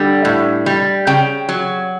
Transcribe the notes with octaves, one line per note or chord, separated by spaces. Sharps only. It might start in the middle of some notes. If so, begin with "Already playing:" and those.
Already playing: D3 G3
A2
G3
C#3 G5
F#3